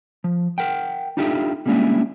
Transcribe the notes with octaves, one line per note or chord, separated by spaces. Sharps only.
F3
A#4 F#5 G5
D4 D#4 F4 G4 A4 E5
G3 G#3 A#3 C#4 D4 E4